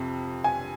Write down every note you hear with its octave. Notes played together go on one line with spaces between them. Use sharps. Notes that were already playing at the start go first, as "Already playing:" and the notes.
Already playing: F2 C3
G#5